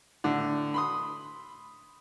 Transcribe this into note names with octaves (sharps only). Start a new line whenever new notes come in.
A2 D3
B5 C6 D#6